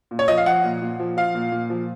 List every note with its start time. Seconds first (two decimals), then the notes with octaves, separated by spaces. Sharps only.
0.11 A#2
0.19 C#5
0.28 F3 D#5
0.37 F5
0.46 F3 F#5
0.64 A#2
0.82 A#2
1.00 F3
1.17 F3 F5
1.35 A#2
1.52 A#2
1.70 F3